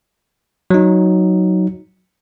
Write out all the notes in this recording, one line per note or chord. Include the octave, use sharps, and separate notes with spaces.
F#3 D#4